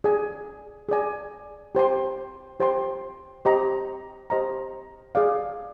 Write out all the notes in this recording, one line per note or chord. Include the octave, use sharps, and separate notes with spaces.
G#4 D5 G#5
G#4 D5 G#5
G4 C5 G5 C6
G4 C5 G5 C6
G4 C5 D#5 A#5
G4 C5 D#5 A#5
G#4 D5 F5